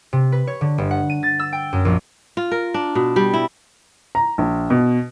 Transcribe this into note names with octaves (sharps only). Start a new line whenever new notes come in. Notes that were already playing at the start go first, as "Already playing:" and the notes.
C3
B4
C#5
D3
G1
F#5
D#7
A6
E6
G5
F#2
A#1
F4
A#4
D4
B2
G3
E4
A#5
A#1
B2